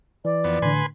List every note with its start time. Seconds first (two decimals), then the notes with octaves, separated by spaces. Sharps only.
0.25 E3 D5
0.44 F2 B3
0.62 A2 D3 B4 G#5 C6